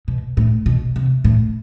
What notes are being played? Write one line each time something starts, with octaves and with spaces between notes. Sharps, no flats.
B2
A2
B2
C3
A2